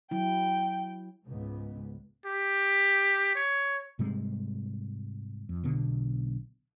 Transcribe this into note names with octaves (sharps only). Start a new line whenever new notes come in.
F#3 E4 G5
C#2 G#2 B3
G4
C#5
G#2 C3 G3 G#3
F2
B1 B2 D3 B3